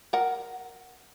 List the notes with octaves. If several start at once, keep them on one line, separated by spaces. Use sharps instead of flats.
A#4 F#5